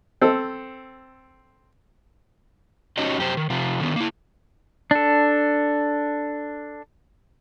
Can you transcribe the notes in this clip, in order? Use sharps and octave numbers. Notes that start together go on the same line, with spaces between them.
C4 A4
C#4 D#4 F#4 G4 C#5 D#5
F#2 G4 C5
D#3
C3 F3
D3 D#3 B3
A#3 E4
D4 A4